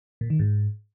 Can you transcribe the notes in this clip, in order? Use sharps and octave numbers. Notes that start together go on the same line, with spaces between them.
A#2
D#3
G#2